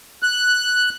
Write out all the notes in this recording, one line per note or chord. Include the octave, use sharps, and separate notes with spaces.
F#6